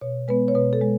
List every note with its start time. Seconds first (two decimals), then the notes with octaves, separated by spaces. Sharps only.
0.01 B2 C#5
0.28 G#3 B3 B4
0.48 C#5
0.55 B2 B4
0.73 A4
0.82 G#3